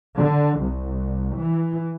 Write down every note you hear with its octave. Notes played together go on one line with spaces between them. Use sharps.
D3
C2
E3